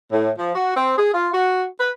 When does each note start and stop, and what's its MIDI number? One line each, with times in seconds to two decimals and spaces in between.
0.12 0.30 45
0.39 0.51 53
0.56 0.72 66
0.75 0.96 60
0.97 1.09 68
1.13 1.30 65
1.34 1.65 66
1.80 1.90 71